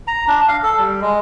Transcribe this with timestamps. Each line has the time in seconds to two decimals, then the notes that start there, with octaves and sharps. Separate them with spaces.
0.07 A#5
0.28 D4
0.48 F5
0.63 A4
0.78 G3
1.01 G#3